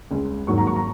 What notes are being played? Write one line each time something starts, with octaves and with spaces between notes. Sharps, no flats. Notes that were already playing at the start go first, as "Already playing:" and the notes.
C#2 C#3 G#3
G#1 G#2 F#3 A#3 C#6
A#5
C#6
A#5